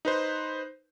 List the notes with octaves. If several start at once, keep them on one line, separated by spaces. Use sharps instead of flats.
D#4 B4 C5